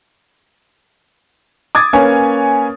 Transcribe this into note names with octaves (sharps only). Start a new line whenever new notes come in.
D6 D#6 G#6 A6
A#3 C#4 B4 C#5 G#5